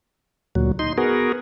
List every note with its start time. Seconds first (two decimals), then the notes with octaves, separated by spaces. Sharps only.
0.55 D2 A#2 F#3
0.79 D#4 C6
0.98 B3 F#4 G#4 A#4